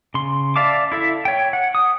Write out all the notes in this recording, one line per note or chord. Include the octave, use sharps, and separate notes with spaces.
C#3 C6
D5 E5 F5 A5 D6
E4 A4 E5
C#5 G5
F#5
D#6